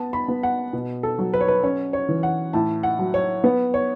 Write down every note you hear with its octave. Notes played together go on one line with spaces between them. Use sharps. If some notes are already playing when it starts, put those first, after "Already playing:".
Already playing: B3 A5
B5
B3
F#5
B2
A4
F#3
B4
C#5
B4
C#4 C#5
C#5
E3
F#5
A2 A5
F#5
F#3
C#5
B3 B4
C#5